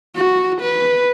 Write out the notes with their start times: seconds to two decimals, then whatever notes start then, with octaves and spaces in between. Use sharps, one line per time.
0.15 F#4
0.62 B4